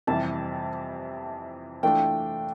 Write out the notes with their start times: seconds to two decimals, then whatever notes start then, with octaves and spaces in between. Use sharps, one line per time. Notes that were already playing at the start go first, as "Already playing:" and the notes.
0.07 F2 C3 E3 G3 A5
1.83 E3 A3 D4 F4 G5